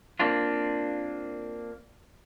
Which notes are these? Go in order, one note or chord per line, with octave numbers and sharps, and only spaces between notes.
A#3 C4 D4 F4